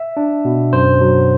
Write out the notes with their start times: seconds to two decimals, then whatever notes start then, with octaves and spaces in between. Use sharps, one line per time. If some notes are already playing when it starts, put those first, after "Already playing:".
Already playing: E5
0.17 D4
0.45 B2
0.73 F#2 C5
1.01 F#3